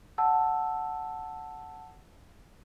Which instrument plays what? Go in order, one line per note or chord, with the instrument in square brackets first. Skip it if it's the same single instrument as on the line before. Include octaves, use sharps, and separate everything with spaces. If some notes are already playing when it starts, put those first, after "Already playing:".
[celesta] F#5 A5 E6